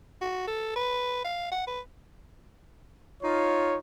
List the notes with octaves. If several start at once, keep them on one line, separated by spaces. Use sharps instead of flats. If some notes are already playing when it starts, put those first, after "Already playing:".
F#4
A4
B4
F5
F#5
B4
D#4 F4 C#5